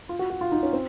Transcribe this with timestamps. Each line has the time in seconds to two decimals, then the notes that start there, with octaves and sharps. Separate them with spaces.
0.09 F4
0.19 F#4
0.30 F#4
0.41 F4
0.52 D#4
0.63 C#4
0.73 C4